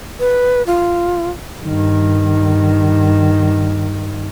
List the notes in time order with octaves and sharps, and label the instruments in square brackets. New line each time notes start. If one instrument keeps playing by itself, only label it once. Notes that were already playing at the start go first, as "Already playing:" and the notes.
[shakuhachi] B4
F4
[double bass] G2 D#3